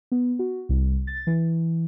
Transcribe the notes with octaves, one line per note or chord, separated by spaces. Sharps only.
B3
F#4
C2
A6
E3